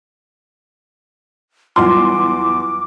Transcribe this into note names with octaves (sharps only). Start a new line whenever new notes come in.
E2 F#3 G3 F4 C6 D6